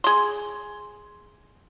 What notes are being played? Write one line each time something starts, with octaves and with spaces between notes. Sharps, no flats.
G#4 C6